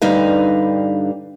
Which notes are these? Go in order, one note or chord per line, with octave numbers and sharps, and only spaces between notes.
G2 D3 G3 D#4 B4 F5